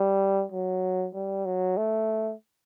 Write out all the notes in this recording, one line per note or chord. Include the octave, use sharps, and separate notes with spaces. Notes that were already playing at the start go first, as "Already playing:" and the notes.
Already playing: G3
F#3
G3
F#3
A3